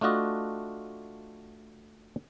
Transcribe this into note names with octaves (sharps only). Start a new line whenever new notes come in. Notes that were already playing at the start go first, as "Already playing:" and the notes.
A3 D4 F4 F#4 D#5